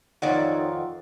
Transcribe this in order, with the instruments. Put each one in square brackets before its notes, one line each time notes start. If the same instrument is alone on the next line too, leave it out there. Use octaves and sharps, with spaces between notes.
[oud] F2 D#3 D5 [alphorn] D#4 [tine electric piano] C#5 F5 F#5